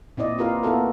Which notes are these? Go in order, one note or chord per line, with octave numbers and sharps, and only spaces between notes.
A#2 C4 E4 D5 D#5
E4 F4 G4 A#4 B4 F5
A#3 B3 E4 F#4 A4 A#4